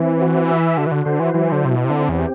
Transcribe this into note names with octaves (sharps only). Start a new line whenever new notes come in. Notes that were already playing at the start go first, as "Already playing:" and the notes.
Already playing: E3 C4
F#4
E5
D3 F#4
E3
D3
D3 C5
E3
E3 F#3
D3
C3 E4
B2
C3
D3 C4
E2
G4